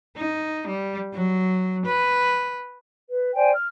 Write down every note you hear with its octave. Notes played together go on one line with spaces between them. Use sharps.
D#4
G3
F#3
B4
B4
C5 D5 G5 G#5
F6